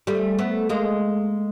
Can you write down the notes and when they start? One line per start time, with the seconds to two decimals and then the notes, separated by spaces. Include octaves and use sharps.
0.07 G3 A3
0.38 A3 B3
0.69 G#3 A#3